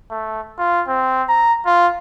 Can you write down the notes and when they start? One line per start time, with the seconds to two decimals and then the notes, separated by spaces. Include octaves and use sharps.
0.11 A3
0.58 F4
0.88 C4
1.28 A#5
1.66 F4